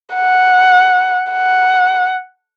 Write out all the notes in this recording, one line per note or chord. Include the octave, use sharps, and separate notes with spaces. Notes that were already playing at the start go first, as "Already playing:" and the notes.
F#5
F#5